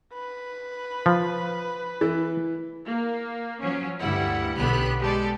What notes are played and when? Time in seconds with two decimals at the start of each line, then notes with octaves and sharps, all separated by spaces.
0.13 B4
1.06 F3
2.01 E3
2.85 A#3
3.61 F3 F#3 C#4
4.00 D2 G2 G3 E4 F#5
4.57 B1 D3 B3 G4 B5 F#6
5.00 G#3 G4 A4 D5